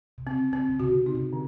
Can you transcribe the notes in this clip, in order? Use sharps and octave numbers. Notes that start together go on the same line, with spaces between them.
C3
C#3 C4
C#3 C4
C#3
C3 F#4
D3
C#3
D#4
C3
D3